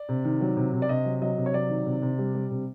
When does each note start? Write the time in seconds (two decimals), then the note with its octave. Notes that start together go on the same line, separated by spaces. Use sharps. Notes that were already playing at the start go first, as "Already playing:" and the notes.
Already playing: D5
0.09 C3
0.25 D#3
0.41 F#3
0.57 C3
0.73 C3
0.82 D5
0.89 C3 D#5
1.05 F#3
1.22 F#3 D#5
1.38 C3
1.46 C#5
1.54 F#3 D5
1.70 D#3
1.86 C3
2.02 C3
2.19 G3
2.35 G3
2.51 C3